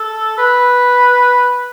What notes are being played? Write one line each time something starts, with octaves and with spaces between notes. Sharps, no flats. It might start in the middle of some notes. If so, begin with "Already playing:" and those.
Already playing: A4
B4